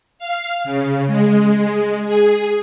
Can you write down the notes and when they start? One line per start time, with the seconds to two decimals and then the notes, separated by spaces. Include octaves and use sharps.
0.19 F5
0.64 C#3
1.07 G#3
2.05 G#4